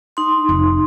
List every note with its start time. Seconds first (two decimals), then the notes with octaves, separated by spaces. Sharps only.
0.17 D#4 C6
0.49 F1